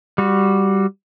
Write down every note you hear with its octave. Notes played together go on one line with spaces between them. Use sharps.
G3 F#4